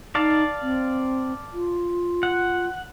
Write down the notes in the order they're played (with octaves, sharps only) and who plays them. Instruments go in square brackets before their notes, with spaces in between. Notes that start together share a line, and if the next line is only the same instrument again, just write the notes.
[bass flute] D#4 [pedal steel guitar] D5 F5 A5
[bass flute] C4
F4
[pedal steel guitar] F#5